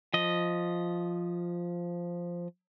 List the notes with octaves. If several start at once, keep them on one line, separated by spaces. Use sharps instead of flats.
F3 D#5